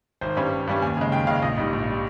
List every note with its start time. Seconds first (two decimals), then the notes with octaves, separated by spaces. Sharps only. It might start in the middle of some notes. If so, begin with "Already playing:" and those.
0.21 G#1 C5
0.37 G2 G3 C#4
0.52 G#1
0.67 G2 G3 C#4
0.82 D#2 G#5
0.97 C#3 G#3
1.12 D#2 G5
1.27 C#3 G#3 F5
1.42 A#1 D#5
1.57 G#2 G3
1.73 A#1
1.90 G3